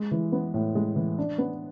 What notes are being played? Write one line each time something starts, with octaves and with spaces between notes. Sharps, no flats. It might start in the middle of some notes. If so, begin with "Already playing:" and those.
Already playing: G#3
E3
B3
A2
G#3
E3
D4
B3